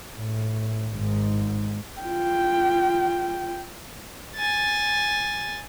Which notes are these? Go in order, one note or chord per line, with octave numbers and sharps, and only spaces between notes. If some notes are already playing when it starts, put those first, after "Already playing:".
A2
G#1 G#2
F4 G5
G#5 A6